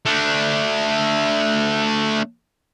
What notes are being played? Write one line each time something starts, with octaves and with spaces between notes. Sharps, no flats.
A3 D4